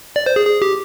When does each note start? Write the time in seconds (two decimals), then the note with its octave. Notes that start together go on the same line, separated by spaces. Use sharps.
0.16 D5
0.26 C5
0.36 G#4
0.47 G#4
0.62 G4